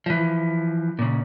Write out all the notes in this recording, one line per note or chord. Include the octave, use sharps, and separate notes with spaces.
E3 F3
A#2 C#3